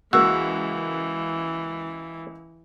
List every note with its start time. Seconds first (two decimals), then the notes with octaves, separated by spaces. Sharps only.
0.13 C#2 E3 A#3 F#4 E6